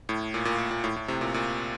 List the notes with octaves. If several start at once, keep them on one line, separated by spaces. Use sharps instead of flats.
A2
A#2
A#2
A#2
A#2
A2
A2
A2 C3
A#2
A#2